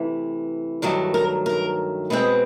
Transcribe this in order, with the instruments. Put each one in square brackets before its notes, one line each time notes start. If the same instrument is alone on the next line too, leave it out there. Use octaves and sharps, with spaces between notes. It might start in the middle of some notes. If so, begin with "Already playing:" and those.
Already playing: [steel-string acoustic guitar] C3 E3 A3
G2 D#3 F#3 A3
A#4
A#4
B2 G#3 C4 B4